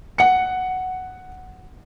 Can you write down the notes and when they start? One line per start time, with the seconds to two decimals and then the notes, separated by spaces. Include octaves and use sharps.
0.18 F#5 C#7